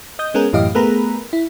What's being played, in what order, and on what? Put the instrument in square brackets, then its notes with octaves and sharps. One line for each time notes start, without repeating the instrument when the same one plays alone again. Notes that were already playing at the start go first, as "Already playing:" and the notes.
[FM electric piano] D#5 D#6 G6
G#3 B3 C#4 G#4 A#4
F#2 A2 E3 G4 D#5 F5
A3 B3 G#4 A#4 A#5 B5
E4